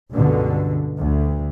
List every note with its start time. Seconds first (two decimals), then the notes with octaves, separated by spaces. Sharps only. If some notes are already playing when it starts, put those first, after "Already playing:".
0.12 C#2 G2 B2 D3
0.99 D2